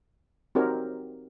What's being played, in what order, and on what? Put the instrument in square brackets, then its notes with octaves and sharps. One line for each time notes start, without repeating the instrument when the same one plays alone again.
[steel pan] C4 D#4 F#4 G4 A#4 C#5